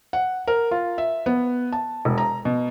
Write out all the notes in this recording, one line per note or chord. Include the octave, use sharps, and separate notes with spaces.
F#5
A#4
F4
E5
B3
A5
E1
A#5
B2